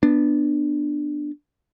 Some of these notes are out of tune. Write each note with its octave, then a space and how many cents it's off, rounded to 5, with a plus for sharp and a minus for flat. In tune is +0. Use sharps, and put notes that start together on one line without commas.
B3 +0 D4 +10